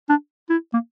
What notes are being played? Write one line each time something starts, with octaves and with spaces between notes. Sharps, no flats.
D4
E4
A#3